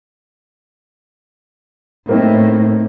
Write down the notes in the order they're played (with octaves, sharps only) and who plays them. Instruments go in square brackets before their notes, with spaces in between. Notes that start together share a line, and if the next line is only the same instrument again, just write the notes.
[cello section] A2 [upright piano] A#3 C4 D#4